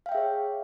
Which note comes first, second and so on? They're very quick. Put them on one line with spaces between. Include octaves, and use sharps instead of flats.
F5 G5 E5 G#4 C#5